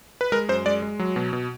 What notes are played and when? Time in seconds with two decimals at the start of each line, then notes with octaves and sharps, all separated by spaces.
0.21 B4
0.32 G#3 A#4
0.49 F#2 C5
0.66 G#3 D5
0.82 G#3
0.99 F#3
1.16 B2
1.33 B2